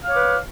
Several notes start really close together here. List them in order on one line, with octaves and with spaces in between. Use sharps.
F5 C#5 D6 B4